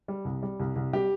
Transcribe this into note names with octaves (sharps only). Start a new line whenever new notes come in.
G3
C2
G3
C2
C2
G3 G4